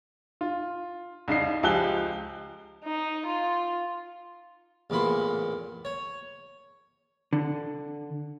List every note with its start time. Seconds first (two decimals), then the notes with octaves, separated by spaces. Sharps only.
0.41 F4
1.28 C2 C#3 D#4 C7
1.63 C#2 F3 G4 G#5 F#6 G7
2.84 D#4
3.26 F4
4.90 A1 E2 A#2 B5 C6
5.85 C#5
7.33 D3